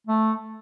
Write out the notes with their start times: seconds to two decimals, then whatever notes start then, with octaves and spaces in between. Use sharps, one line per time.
0.07 A3